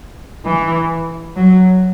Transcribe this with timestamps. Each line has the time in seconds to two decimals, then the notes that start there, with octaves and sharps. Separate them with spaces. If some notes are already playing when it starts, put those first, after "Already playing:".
0.45 E3
1.36 F#3